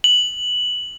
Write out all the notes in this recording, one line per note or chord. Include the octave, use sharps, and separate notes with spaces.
F#7